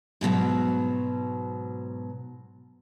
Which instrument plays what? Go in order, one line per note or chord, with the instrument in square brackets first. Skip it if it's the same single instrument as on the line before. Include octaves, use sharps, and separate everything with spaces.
[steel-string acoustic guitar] G#2 B2 D#3 F#3